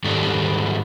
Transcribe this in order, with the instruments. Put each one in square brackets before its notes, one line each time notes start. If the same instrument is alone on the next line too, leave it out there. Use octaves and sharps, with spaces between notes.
[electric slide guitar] G#2 D#3 G3 A4